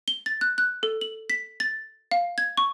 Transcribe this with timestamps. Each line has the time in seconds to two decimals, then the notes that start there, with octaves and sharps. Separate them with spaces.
0.08 G7
0.26 A6
0.41 F#6
0.58 F#6
0.83 A4
1.01 F#7
1.30 B6
1.60 A6
2.11 F5
2.38 G#6
2.57 C#6